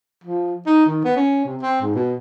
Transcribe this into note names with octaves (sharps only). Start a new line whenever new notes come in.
F3
D#4
D#3
B3
C#4
C3
C4
G#2
B2